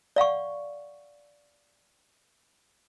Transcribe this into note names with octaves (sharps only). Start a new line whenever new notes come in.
D5 F5 F#5 C#6